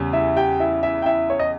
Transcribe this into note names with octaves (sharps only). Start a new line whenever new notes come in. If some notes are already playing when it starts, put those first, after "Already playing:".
Already playing: E2 C#3 G3
E4 E5
G4 G5
E4 E5
E4 E5
G5
E4 E5
C#5
D#5